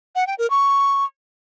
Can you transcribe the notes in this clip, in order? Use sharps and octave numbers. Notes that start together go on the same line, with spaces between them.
F#5
G5
A#4
C#6